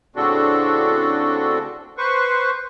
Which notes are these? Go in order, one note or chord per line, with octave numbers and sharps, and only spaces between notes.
A2 C#3 C4 D4 F#4 A4
B4 C5 C#6